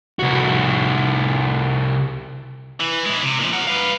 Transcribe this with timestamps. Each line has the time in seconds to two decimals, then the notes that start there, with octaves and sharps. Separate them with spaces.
0.19 C2 F#4
2.80 E3
3.06 G#3 E4
3.22 C3
3.40 A#2 F3
3.52 A#4 F#5
3.67 B4 F5